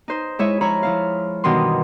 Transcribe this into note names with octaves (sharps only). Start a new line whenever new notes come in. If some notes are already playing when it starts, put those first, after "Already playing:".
D#4 C5
G#3 E4 C#5 E5 G#5
F3 E4 C#5 A#5 B5
F3 E4 F5
G2 B2 D#3 E3 C6